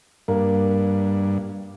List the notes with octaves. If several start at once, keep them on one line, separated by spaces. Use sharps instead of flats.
G2 A#3